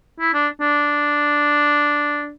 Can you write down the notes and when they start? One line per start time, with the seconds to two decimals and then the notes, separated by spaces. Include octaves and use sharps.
0.20 E4
0.34 D4
0.60 D4